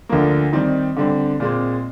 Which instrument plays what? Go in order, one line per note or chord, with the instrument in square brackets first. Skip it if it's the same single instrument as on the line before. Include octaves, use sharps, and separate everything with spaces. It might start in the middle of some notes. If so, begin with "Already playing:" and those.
[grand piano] D2 D3 F3 A#3
D#3 G3 C4 D#4
D3 G3 C4
A#2 G#3 C4